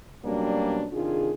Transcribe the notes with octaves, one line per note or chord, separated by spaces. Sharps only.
B2 F#3 G3 A#3 C#4 D4
C3 D#3 D4 F4 G#4